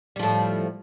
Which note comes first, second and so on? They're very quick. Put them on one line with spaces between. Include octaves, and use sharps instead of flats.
G3 F3 A2